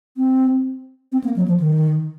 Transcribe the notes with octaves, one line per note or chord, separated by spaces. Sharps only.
C4
C4
A#3
F#3
F3
D#3